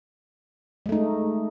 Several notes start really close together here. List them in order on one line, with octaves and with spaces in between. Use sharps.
G#3 A3 D#4